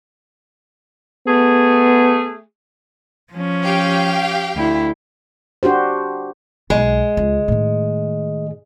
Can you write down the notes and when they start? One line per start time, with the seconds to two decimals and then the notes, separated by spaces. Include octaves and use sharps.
1.27 A3 B3 G#4
3.33 F3 C#4
3.65 G4 F5 G5
4.56 D2 E4
5.63 D4 F#4 G4 C5
6.70 B1 G#3
7.17 C#2
7.48 A2 D#3